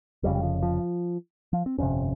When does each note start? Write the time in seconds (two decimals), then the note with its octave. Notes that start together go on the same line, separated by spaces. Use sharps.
0.23 F1 F2 C#3 G3
0.35 G3
0.43 F3
0.63 F3
1.53 F3
1.66 C4
1.78 G1 F2 C3 C#4